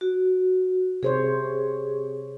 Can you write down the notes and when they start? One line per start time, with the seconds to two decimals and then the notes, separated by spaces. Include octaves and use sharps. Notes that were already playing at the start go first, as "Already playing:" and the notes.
0.01 F#4
1.03 C3 G#4 C5 C#5